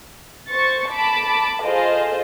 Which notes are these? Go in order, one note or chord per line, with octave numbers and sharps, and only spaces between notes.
C5 C#6 A6
A5 B5 D6
F4 G#4 A4 C5 D#5